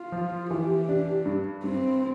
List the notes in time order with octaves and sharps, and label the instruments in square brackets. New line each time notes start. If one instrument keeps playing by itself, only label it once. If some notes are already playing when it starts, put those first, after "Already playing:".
Already playing: [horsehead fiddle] F4
[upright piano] F3
[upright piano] E3 [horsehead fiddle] G4
[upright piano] D4
G2
[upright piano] G2 [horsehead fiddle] C4